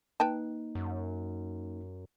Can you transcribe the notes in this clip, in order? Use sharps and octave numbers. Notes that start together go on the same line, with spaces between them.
A#3 D#4 B4 G5 A5
F#2